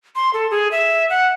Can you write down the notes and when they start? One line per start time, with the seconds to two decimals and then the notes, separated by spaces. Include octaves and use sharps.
0.16 C6
0.34 A4
0.51 G#4
0.72 E5
1.10 F#5